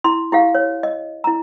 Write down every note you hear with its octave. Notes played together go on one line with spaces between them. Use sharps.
E4 C6
E4 G4 F5
C#5
D#5
E4 A#5